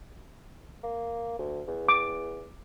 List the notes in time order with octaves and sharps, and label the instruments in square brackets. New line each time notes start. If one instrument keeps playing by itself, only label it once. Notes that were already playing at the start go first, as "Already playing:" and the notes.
[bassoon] A#3
D2
E2
[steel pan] D6